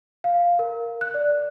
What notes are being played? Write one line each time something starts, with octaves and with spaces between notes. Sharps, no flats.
F5
A#4
F#6
D5